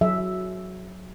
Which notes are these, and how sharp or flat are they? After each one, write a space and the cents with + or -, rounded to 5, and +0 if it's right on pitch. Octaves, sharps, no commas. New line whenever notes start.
F#3 +0 G#4 +35 E5 +0